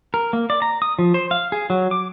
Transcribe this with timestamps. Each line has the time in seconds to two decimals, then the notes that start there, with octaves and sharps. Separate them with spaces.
0.14 A#4
0.33 A#3
0.50 D5
0.62 A#5
0.82 D#6
0.99 F3
1.14 C5
1.31 F5
1.52 G#4
1.70 F#3
1.91 D6